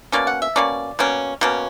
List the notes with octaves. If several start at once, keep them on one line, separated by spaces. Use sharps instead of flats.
B2 A#3 C#4 D5
F#5
E5
B2 A#3 C#4 D5
B2 A#3 C#4
B2 A#3 C#4